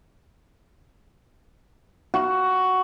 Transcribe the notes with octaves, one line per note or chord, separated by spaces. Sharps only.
F#4